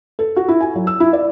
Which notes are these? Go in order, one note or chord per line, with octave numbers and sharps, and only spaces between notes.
A4
F#4
E4
G#5
F#3
E6
E4
D5